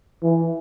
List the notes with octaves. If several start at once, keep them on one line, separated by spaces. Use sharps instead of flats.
E3